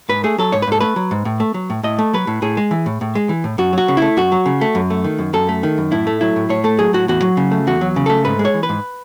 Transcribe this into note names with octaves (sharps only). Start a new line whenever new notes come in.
G#2 B4
A3 G#4
F#3 A4
G#2 C#5
B4
G#2 A4
A3 B4
F#3
G#2
A2
A3
F#3
A2
A2 D#5
A3
F#3 B4
A2
A2 G#4
G#3
E3
A2
A2
G#3
E3
A2
F#2 F#4
F#3 F#4
C#3
A3 E4
F#2 F#4
F#3
C#3
A3
F#2
A3
D#3
F#2
F#2 A4
A3
D#3
F#2
A2 E4
A3
F#3 E4
A2
A2 C#5
A3 A4
F#3 G#4
A2 F#4
E2 F#4
F#3
C#3
A3
E2 F#4
F#3
C#3
A3 A4
G#2 B4
G#3
C#5
E3
B4
G#2